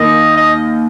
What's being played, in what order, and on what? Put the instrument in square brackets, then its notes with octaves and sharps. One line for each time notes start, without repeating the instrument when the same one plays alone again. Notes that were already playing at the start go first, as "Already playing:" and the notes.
Already playing: [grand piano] D#2 D#3 A#3 [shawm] D#5
[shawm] D#5